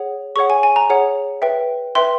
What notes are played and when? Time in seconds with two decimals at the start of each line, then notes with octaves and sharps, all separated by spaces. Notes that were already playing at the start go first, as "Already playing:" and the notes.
Already playing: G#4 C#5 F#5
0.36 G#4 C#5 F#5 C#6
0.50 G#5
0.63 G#5
0.76 A#5
0.90 G#4 C#5 F#5
1.42 B4 E5 G5
1.95 B4 E5 G5 C6